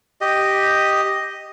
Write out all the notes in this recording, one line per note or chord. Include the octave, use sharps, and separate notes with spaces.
G4 D#5